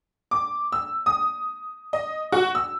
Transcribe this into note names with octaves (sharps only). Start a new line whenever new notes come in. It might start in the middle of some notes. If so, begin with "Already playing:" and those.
D6
E6
D#6
D#5
F#4
E6